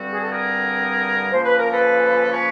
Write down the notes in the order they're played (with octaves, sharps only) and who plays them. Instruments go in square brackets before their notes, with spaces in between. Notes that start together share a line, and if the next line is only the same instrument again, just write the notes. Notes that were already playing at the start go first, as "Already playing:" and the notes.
Already playing: [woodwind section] G2 D3 G3 C4 F#4
G#4
A4
G#4 A#4
C#3 F3 A#3 C5
B4
A#4
A4 B4
B4 C#5